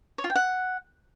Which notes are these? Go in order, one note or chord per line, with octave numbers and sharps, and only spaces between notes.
C#5
F4
G5
F#5